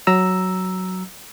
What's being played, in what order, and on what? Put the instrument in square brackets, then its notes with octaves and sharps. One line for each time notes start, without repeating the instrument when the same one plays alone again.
[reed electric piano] F#3 A#5 E6